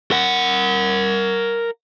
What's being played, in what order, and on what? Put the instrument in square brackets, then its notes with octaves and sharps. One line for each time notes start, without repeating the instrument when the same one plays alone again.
[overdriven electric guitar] A#4 F#5